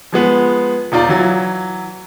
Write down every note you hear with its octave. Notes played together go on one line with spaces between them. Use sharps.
F3 G#3 B3 F#7
E1 D#4 F4 D5 A#5
E3 F#3